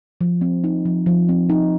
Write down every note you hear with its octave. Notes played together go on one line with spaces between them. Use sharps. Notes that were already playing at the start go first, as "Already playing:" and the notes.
F3
C4
D#4
F3
F3
C4
D#4